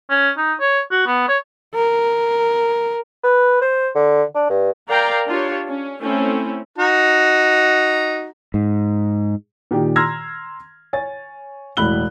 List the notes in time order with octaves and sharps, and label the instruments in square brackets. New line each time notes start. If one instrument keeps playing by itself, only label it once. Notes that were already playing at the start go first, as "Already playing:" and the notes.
[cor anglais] C#4
D#4
C#5
F#4
B3
C#5
[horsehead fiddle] A#4
[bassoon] B4
C5
D3
D4
G2
[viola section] A#4 D5 F5 G5 A#5
D4 F4 G4 C#5
C#4
A3 C4 C#4 E4
[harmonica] D#4 F#4 A#5
[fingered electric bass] G#2
[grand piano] A#2 D#3 G4
A#5 C6 E6 F6 G#6 A#6
C#5 G#5 A6
E1 A2 B5 F#6 G7